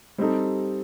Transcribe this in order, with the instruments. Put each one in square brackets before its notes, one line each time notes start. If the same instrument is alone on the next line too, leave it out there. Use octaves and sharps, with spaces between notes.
[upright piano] G3 C4 D#4 A4